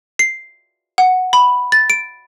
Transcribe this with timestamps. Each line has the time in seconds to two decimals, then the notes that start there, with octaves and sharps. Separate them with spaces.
0.19 C7
0.98 F#5
1.33 B5
1.72 A6
1.90 D7